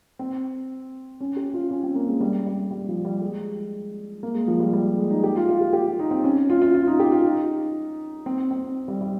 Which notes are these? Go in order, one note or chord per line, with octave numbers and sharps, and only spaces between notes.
C4
C#4
G4
F4
C#4
C4
A#3
G#3
G3
G3
G3
F3
G3
G#3
A#3
G#3
F3
G3
G3
G#3
D#4
G4
F4
F4
G4
G4
D#4
C4
C#4
F4
F4
F4
D#4
G4
F4
D#4
C4
C4
G3
G3